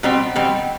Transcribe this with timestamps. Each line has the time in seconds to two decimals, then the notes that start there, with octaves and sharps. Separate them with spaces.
0.03 B2 G3 C4
0.36 B2 G3 C4